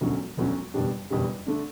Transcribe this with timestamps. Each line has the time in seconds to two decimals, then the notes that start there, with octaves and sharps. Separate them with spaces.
0.01 E1 D2 D3 F#3 C#4
0.37 E1 D2 D3 F#3 C#4
0.74 F#1 E2 B2 G3 D4
1.10 F#1 E2 B2 G3 D4
1.46 D3 A3 D4